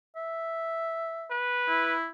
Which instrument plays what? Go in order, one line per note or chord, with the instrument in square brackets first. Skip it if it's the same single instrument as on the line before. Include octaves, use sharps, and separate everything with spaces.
[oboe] E5
[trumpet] B4
[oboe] E4